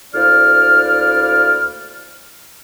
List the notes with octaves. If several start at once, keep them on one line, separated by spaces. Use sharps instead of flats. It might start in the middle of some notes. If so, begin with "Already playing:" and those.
D2 A#3 E4 C5 D5 F6